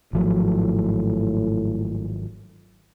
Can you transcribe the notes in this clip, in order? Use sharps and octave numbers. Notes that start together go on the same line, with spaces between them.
G#1 A2 F3 F#3